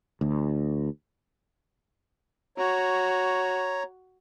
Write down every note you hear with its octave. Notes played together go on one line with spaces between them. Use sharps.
D2
F#4 C#5 A#5